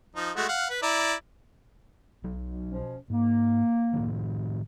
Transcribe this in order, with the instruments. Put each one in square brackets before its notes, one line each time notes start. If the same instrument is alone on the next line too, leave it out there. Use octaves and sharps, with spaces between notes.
[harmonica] F3 D#4
G#3 A3 F#4
F5 F#5
B4
E4 D5 A#5
[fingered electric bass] B1 F#3
[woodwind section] B2 F3 C#4
[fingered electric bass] G#2 [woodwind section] A#3
[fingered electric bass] A2 D#3 F3